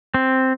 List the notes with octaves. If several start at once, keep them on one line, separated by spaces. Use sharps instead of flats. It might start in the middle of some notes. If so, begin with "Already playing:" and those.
C4